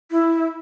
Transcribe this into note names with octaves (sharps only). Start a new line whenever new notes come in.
E4